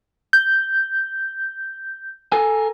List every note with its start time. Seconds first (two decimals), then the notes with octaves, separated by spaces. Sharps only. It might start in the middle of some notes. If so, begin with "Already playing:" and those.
0.33 G6
2.32 A4 A#4 G#5